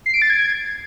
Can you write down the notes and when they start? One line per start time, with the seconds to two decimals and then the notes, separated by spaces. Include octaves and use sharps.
0.06 C7
0.14 D7
0.22 A6
0.30 G#6